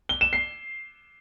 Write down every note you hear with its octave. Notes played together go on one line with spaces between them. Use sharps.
G7
E7
C7